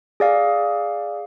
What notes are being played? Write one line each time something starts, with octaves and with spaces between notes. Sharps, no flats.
G#4 D5 F5